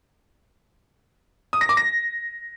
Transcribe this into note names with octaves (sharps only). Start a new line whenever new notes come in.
D#6
A#6
D6
A#6